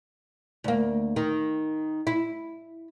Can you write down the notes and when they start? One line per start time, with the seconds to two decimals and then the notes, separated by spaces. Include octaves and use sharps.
0.64 D2 A#3
1.16 D#3
2.07 E4